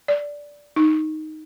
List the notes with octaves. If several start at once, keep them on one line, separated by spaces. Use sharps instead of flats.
D5
D#4